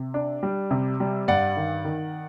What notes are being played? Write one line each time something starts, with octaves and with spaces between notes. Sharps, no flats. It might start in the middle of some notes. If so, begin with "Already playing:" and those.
Already playing: C3
D4
G3
C3
G3
G2 D5 F#5
D#3
D#3